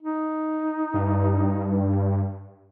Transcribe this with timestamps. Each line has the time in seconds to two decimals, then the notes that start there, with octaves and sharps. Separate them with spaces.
0.02 D#4
0.94 G2